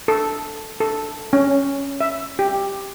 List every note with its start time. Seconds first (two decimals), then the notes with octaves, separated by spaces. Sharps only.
0.08 A4
0.80 A4
1.33 C#4
2.01 E5
2.39 G4